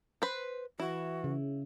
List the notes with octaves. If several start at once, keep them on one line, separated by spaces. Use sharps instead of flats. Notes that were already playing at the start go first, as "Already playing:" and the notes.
B4 C5
E3 E4 F#4
C#3